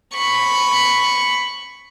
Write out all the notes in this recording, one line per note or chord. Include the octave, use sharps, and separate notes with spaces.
B5 C#6